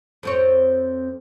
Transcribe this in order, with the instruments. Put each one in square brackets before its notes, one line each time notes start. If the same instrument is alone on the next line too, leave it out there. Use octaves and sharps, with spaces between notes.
[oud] F2 C4 C#5